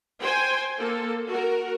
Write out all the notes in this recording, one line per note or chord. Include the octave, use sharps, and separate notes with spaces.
C5 G5 G#5
A#3 A4
F#4 A#4